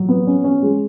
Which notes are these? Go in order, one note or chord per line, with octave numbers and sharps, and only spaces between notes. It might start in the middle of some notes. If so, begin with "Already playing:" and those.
Already playing: F#3
B3
C#4
C#4
G#3